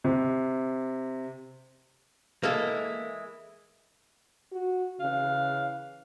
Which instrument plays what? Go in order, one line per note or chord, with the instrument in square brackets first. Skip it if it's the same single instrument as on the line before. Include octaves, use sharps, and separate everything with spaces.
[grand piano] C3
[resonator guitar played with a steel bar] E3 G#3 E4 [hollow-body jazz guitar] A#3 A4
[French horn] F#4
[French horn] C#3 [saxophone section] E3 F5